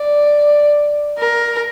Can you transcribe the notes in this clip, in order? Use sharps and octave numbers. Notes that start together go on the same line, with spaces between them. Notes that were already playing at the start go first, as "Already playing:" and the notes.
Already playing: D5
A#4